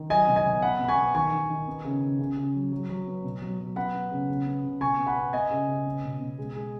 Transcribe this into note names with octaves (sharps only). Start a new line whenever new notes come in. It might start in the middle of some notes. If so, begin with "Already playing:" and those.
Already playing: D#3
F#3 D#5 G#5
B2
D#5 G#5
B2
B3 F#5 B5
B2 B5
G#5 C#6
B3
D#3 G#5 C#6
D#3
D#3
B3
C#3
C#3
C#3
C#3
F#3
F#3
F#3
B3
B2
F#3
F#3
B3 F#5 B5
B3
C#3
C#3
B3
C#3
B2 G#5 C#6
B3
F#5 B5
B3
B3 D#5 G#5
C#3
C#3
B3
B2
B2
G#3
G#3